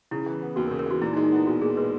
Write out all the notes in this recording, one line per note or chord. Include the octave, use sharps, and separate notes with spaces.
C#3 E4
E3
B3
D#2 F#4
A#4
C#3
A#4
E3 F#4
A#2 E4
D#4
G#3
D#4
B3 E4
B1 F#4
A#2 G#4
G#3 B4